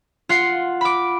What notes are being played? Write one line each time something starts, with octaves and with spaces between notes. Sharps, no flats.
F4 F#5 C7
B5 D6